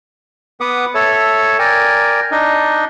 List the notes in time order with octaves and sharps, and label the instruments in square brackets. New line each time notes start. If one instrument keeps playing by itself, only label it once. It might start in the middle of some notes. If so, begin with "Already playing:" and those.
[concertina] B3 B4 F#5 D6 D#6
A4 C#5 E5
A#4 D5 G5 G#5
D4 D#4 D#5